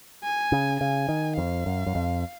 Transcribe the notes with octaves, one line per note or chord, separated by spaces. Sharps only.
G#5
C#3
C#3 G#5
D#3
F2 F5
F#2
F#2
F2